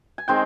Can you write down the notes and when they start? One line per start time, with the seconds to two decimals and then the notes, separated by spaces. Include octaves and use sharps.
0.18 G#5
0.28 D#3 G#3 C4 G5